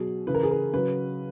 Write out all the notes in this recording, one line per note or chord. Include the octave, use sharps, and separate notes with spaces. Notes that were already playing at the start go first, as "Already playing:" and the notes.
Already playing: B2 F#3 G#4
C#3 E3 B4
A#4
G#4
A#4
C#3 F#3 B4